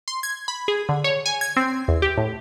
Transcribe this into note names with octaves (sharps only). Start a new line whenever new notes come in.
C6
G#6
B5
G#4
D3
C#5
G#5
G#6
C4
E2
G4
A2